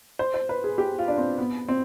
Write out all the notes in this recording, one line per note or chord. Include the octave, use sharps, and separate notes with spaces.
C5
C5
B4
G#4
G4
F4
D4
C4
B3
C4